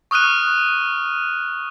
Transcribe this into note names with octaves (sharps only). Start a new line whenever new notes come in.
C#6 D#6 F6 F#6 D#7